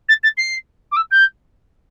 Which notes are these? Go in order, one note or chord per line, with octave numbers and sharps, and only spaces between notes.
A6
A6
C7
D6
E6
G6